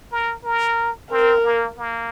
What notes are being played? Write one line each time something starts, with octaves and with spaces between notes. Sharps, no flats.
A#4
A#4
C4 A#4
A#3
A#3